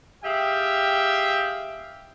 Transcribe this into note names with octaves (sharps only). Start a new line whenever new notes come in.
G4 G#4 E5 F5 G5